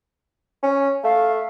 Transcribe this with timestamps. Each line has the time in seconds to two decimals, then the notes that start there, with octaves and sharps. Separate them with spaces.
0.63 C#4
1.04 A3 F5